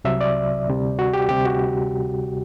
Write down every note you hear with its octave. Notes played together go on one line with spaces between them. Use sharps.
C2 C3 F#3 E5
D5
D2 C3 G3
F#4
G4
D2 C3 G3 G4
F#4